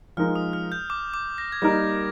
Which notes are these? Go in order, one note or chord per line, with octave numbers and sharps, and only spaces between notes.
F3 G#3 D#4 A#4 F6
D#6
F6
G6
D6
D6
A#6
G#6
G3 A#3 D#4 A#4 A#6